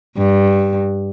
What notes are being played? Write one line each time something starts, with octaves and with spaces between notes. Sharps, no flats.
G2